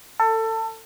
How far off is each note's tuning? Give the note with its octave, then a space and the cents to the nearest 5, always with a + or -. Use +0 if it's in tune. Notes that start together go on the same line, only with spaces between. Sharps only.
A4 +25